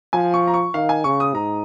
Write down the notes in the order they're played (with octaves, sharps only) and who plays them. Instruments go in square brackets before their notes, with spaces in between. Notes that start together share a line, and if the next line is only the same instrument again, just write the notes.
[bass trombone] F3 [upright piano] G#5
[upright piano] C#6
A#5
C#6
[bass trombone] D#3 [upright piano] F5
[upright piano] G#5
[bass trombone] C#3 [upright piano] C#6
[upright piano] D#6
[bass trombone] G#2 [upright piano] A#5